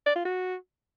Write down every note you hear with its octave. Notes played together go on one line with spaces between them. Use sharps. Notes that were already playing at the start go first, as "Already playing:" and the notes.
D5
F4
F#4